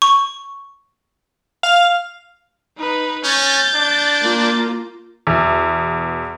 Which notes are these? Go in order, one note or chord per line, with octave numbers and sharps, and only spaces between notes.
C#6
F5
D#4 B4
C#4 G6 A6
D4
A#3 F4
E2 B2